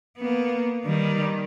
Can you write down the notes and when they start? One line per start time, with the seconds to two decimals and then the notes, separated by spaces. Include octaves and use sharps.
0.17 A#3 B3
0.85 D#3 G3